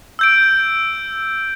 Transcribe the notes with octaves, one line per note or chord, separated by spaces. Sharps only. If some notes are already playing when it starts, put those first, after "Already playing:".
E6 G6 D7